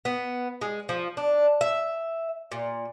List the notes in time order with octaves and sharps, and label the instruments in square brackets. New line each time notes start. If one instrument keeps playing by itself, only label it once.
[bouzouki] B3
G#3
F3
D4
E5
A#2